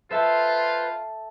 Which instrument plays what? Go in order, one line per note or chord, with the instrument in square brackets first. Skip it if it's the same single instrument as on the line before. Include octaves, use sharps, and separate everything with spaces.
[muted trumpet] F4 [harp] A4 E5 A5 [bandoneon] B4 C5